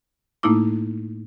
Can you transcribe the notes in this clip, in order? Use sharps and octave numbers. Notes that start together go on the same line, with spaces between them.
A2 A3 A#3 D#4 E4 D6